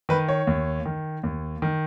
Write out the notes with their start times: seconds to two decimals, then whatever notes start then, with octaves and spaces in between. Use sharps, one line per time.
0.09 D#3 B4
0.29 C#5
0.47 D#2
0.86 D#3
1.23 D#2
1.62 D#3